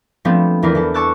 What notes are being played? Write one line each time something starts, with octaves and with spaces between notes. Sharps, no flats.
F3 G3 A3 B3 C4 D4
E2 E3 A#4 B4 D5 C7
E3 A4 A5
A5 C#6 D6 E6 F#6 A6